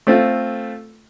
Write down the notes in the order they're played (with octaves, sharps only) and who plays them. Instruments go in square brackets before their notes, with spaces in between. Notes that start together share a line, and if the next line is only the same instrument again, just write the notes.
[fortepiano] A3 C4 F4